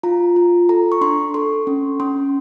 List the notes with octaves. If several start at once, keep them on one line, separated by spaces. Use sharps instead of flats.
F4 A#5
F4
A4 A#5
C#6
D4 C6
A4 C6
C#4
C#4 C6